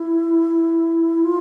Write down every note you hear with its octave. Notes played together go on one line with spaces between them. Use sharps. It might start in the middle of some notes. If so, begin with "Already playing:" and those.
Already playing: E4
F4